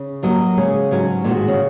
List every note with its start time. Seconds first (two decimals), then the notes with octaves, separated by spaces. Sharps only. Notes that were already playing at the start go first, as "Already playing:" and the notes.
Already playing: C#3
0.22 F#2 F#3 A#3 F#4 D#5
0.57 C#3 G#3 C#4 G#4
0.91 G#2 F#3 C#4 F#4
1.24 A#2 D#3 G#3 F#4
1.37 G#2
1.48 C#3